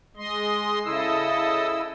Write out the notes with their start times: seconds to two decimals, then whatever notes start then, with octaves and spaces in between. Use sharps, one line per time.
0.17 G#3 D#5 C6
0.86 C#3 E4 A4 D#5 E6